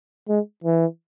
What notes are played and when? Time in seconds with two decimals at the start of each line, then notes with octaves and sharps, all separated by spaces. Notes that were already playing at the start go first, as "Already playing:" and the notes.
0.29 G#3
0.64 E3